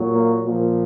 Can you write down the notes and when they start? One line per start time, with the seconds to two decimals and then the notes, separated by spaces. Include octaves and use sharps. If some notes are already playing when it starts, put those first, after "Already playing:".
Already playing: A#2 F#3
0.13 A#3
0.45 A#2 F3